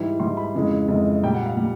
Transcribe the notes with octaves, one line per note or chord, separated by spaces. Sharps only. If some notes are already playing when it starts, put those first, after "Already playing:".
Already playing: G#2 E3 G3
G#2 E3 G3 C6
B5
F2 C#3 E3 G#3
F2 C#3 E3 G#3
A#2 G3 G5
F#5
F5
G3